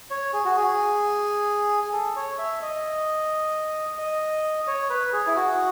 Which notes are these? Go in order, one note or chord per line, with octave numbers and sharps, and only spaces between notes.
C#5
G#4
F#4
G#4
A4
C#5
E5
D#5
D#5
C#5
B4
G#4
E4
F#4